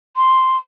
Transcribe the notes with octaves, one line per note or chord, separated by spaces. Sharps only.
C6